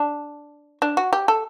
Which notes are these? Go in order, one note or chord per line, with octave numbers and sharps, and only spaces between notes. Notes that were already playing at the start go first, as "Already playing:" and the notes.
Already playing: D4
D4
F#4
G4
A4